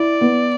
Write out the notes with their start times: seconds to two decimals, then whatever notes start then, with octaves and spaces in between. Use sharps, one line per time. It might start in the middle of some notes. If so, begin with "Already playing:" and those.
Already playing: E4 D5
0.21 B3